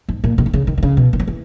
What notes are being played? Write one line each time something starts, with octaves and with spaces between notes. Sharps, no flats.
G#2
A#2
B2
D#3
C#3
D#3
D#3
C#3
B2
D#3
F#3
E3